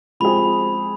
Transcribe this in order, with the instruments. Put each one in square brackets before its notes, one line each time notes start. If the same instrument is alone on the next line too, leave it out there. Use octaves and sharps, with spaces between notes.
[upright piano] F3 G#3 C4 G#4 [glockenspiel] B5